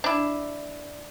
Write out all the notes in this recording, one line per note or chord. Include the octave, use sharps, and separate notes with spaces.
D4 E4